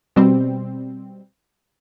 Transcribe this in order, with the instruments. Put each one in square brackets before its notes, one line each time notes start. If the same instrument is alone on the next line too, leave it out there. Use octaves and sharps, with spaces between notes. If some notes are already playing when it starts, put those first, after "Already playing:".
[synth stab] B2 G3 C4